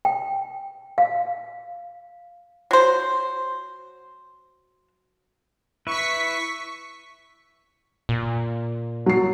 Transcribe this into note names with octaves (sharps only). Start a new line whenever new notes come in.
G5
F5
F#3 C5
E4 B4 C#6 B6
A#2
F#3 C7